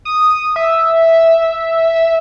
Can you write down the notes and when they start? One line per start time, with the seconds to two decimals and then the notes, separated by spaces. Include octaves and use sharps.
0.05 D#6
0.56 E5